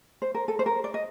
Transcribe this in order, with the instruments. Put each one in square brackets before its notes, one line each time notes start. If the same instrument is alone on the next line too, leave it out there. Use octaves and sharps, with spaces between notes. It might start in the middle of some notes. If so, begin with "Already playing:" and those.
[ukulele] C5
A#4
A4
C5
A#4
D5
D#5